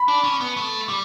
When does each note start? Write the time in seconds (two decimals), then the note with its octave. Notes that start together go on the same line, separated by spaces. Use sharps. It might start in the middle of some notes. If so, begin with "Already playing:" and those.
Already playing: B5
0.08 D4
0.24 C#4
0.41 B3
0.57 A3
0.89 G3